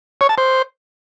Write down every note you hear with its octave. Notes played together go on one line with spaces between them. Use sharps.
C#5
A5
C5